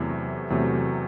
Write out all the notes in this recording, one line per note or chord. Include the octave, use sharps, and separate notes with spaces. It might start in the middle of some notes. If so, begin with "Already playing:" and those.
Already playing: E2 C3 F#3 A3 E4
E2 C3 F#3 A3